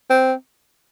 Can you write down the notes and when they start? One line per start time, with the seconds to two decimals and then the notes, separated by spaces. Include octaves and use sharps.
0.10 C4